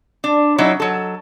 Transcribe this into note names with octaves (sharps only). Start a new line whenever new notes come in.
D4
F#3 C#4 D#4 E4
F#3 A4